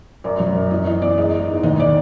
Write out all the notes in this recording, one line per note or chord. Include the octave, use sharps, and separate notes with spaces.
F#2 D5
F#3
F#2
E2 D#5
E2 D#5
E2 D5
G#3 D#5
G#3
G#2
D#2 D#5
D5